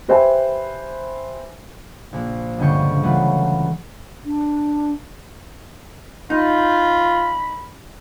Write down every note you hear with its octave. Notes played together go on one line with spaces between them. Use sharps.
G4 B4 C5 E5 G5 G#5
A#1
C#2 G2 D3 G3 G5 C#6
E3 F#3 G3 A3 F4 B4
D4
D#4 F4 B5